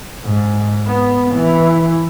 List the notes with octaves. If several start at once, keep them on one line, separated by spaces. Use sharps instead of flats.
G#2
B3
E3